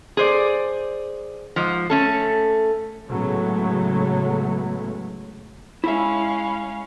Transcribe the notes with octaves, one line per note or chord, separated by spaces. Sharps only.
G#4 C5 D5
G#2 F3
A3 C#4 A4
A2 C#3 F#3 G#3 A3 B3
G#3 C#4 E4 E5 F5 B5